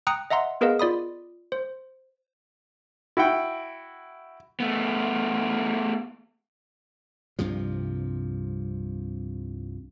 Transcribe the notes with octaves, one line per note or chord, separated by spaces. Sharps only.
G5 A#5 D#6 F#6 C#7
D#5 E5 F#5 A#5 C6
B3 G#4 A#4 B4 D#5 F5
F4 D5 B5 D#6
C5
E4 F#4 F#5 G5
A3 B3
C2 G2 C3 F3